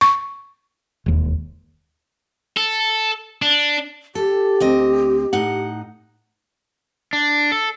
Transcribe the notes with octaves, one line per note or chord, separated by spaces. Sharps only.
C#6
E1 D#2
A4
D4
G4 A4
D2 C4 D#5
A2 D#4 F#5
D4
A4